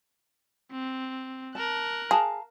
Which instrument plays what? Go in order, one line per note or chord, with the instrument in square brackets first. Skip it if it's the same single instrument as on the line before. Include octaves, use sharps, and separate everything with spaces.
[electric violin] C4
[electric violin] A#4 F#6 [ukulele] A5
[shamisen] G#4 [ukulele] F5 A5 A#5